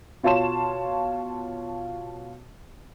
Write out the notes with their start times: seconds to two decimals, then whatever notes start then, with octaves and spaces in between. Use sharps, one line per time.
0.23 B2 F4 C#5 A5 C6 E7